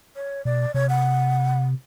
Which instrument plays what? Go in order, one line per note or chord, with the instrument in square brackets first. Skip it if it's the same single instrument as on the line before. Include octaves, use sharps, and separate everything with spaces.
[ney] C#5
[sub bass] B2 [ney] D5
[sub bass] C3 [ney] C#5
[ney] F#5